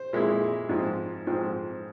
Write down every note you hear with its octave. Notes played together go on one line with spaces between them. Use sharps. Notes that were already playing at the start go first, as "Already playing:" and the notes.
Already playing: C5
A#2 G#3 E4
G#2 F3 C4
G#2 F3 C4